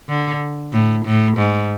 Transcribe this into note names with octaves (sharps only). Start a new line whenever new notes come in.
D3
A2
A2
G#2